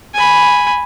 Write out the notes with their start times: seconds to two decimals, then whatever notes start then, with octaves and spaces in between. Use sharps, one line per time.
0.14 G#5 B5